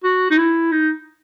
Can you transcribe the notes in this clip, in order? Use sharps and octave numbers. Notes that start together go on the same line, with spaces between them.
F#4
D#4
E4
D#4